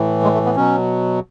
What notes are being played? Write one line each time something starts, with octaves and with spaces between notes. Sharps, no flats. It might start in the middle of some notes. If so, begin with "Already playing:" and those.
Already playing: A2 E3
G#3
A3
B3
B2 F#3 C#4